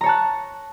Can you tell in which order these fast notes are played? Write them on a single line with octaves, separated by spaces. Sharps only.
A#5 C#5 A5 F#6